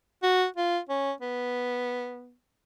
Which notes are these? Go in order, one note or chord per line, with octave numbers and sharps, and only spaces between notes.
F#4
F4
C#4
B3